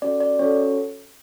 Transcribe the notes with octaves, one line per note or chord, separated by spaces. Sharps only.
C#4 F#4 A4 D5
D5
C#4 F#4 A4 C#5